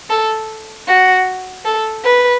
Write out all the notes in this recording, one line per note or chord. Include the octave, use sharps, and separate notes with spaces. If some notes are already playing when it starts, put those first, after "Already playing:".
A4
F#4
A4
B4